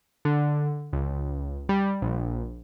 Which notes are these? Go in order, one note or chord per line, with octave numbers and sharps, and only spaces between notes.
D3
C#2
G3
A#1